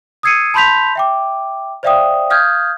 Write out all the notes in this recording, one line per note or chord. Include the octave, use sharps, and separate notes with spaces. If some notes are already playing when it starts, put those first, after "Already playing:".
D#6 E6 G#6 C7 C#7 D#7
A5 B5 C6 G6 B6 F7
E5 G5 D6
C5 D5 E5 F5 G5 D#6
F5 D#6 F6 G6 G#6